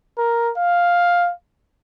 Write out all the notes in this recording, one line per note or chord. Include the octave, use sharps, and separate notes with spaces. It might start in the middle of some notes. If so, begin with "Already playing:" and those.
A#4
F5